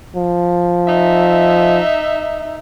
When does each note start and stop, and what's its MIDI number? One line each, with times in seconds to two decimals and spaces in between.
0.16 1.80 53
0.88 2.59 63
0.88 2.59 76